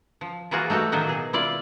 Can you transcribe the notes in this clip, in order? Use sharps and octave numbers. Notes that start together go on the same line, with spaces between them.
F3
E3 A#3 F4 F#4 G#4
A3 D#4 F#4 G4 A4
A2 D#3 F#3 A#3 D#4
B2 G#4
E4 F4 D5